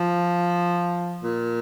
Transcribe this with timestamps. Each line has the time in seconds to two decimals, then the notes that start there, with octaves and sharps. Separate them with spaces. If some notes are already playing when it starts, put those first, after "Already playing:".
Already playing: F3
1.22 A#2